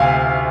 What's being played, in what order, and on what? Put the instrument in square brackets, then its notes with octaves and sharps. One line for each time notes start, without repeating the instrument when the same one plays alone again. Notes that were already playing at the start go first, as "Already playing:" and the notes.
Already playing: [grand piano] D2 C3 F5 G#5